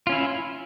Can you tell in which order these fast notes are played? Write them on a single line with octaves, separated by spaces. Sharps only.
F4 C#4 E4